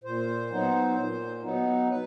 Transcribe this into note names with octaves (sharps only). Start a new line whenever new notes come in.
A#2 C5
F#3 B3 D#4
A#2
F#3 B3 D#4
B2 B4